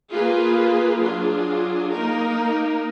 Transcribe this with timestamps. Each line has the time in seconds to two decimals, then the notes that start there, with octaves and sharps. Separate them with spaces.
0.12 A#3 F4 G#4 B4
1.02 F#3 D4 F4 G#4
1.92 A#3 D#4 A#4